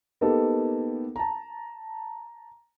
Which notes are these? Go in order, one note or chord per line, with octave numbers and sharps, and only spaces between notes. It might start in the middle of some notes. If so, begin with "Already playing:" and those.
A#3 B3 D#4 G4 A4
A5 A#5